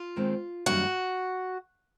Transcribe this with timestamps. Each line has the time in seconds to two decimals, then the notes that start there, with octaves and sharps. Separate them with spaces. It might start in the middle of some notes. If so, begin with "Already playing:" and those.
Already playing: F4
0.16 D#2 D#3 G#3 C4
0.66 F#2 D#3 G3 A#3 D4 F#4